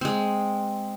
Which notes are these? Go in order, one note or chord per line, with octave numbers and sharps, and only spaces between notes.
G#3 C4